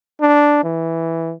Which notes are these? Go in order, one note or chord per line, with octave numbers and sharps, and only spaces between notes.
D4
E3